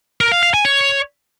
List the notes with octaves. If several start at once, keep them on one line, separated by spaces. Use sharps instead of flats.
A#4
F5
F5
G#5
C#5